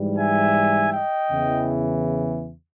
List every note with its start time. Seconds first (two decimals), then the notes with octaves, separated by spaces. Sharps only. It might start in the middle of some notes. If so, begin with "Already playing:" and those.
Already playing: G#2 E3 G3
0.16 E5 G#5
0.92 D#5 G5
1.30 E2 C#3 E3